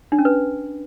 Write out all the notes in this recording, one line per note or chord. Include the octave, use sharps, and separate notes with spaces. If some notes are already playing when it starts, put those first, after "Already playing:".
D4
C#4
B4